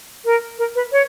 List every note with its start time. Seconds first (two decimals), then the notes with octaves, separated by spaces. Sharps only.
0.25 A#4
0.59 A#4
0.75 B4
0.92 C#5